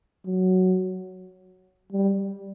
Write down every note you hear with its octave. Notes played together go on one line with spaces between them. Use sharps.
F#3
G3